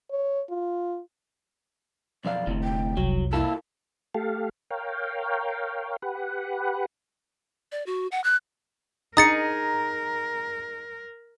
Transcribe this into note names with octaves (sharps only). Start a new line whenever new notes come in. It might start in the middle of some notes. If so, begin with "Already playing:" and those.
C#5
F4
B1 F2 D5 F5
F1 D2 A2 C3
G5
C2 F2 F#3
A#3 E4 F4 A4
A3 G4 A4 F5
A#4 C#5 F5 G5
G4 B4 F#5
D5
F#4
F#5
F#6
D#4 G#4 A#4 A#5 D#6 A6 C#7